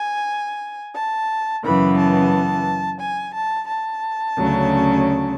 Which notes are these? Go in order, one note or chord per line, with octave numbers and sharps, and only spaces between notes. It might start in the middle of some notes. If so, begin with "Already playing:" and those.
Already playing: G#5
A5
F#2 C#3 E3 B3 B5
A5
G#5
A5
A5
D2 C#3 F#3 C#4